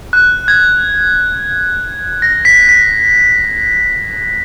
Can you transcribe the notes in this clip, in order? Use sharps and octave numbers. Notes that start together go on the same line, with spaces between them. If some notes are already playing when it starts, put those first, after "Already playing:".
F#6
G#6
A#6
B6
B6